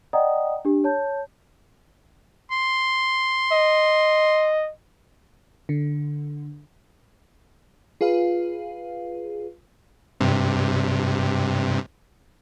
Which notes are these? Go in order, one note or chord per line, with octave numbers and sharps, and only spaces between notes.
D5 D#5 F#5 G5 A#5 D#6
D4 G4
C#5 A5 G6
C6
D#5
D3
F4 G#4 B4 F5
G2 C3